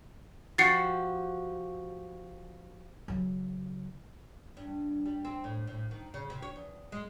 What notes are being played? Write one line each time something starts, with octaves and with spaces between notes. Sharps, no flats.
F3 F#4 G4 A6 C7 C#7
C#3 F#3
G2
G3
C4
A2
A2
D#3
C#3
C3
C#5
E2
G#3